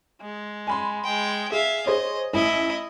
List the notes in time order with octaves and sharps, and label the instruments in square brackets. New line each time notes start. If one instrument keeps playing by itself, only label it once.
[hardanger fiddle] G#3
[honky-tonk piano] G#5 B5 C6
[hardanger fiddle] G#3 G5
[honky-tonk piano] G#4 [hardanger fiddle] E5 F5
[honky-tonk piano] G#4 C5 C#5 [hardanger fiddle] D#5
[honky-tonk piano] A1 [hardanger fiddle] E4 D#5